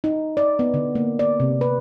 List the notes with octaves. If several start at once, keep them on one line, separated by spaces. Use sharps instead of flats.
D#4
D5
B3
D3
A#3
D5
C3
B4